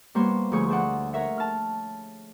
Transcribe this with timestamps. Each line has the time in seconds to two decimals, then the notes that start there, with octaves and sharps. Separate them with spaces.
0.15 G3 A#3 B3 C5 C#5
0.52 D2 F3 G#4 C#5 C#6 G6
0.68 G#4 C5 D5 F#5
1.13 A#4 C#5 E5 F#5
1.38 A5 F6